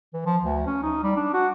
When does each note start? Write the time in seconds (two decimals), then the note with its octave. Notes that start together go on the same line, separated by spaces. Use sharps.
0.14 E3
0.26 F3
0.42 D2
0.67 C#4
0.83 D#4
1.03 G3
1.16 D4
1.33 F#4